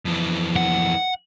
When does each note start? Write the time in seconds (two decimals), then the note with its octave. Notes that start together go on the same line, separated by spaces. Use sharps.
0.05 F2 E3
0.56 F#5